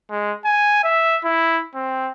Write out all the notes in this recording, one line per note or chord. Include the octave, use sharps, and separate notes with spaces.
G#3
G#5
E5
E4
C4